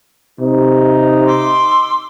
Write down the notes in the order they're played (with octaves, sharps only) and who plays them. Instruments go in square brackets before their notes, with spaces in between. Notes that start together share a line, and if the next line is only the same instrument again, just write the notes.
[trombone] C3 [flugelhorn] D#4
[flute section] C6 D6 E6